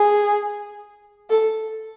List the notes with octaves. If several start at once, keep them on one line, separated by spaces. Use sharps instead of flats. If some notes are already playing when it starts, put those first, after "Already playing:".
Already playing: G#4
A4